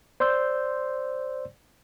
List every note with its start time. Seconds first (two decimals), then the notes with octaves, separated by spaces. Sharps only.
0.20 C5 D5 C6 E6 G6